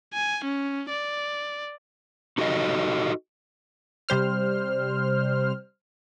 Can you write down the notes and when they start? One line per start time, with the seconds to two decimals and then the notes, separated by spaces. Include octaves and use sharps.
0.14 G#5
0.44 C#4
0.90 D5
2.38 D#4 F#4 G4 A4 D#5
4.09 C3 G3 C5 F6